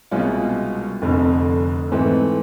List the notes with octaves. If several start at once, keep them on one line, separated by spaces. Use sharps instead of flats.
C2 B2 G#3 C#4 F4
F1 F2 D3
G#2 E3 A3 C4